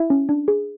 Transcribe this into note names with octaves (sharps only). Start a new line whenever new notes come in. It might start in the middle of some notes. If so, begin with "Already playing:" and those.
Already playing: E4 E5
C#4
D4
G#4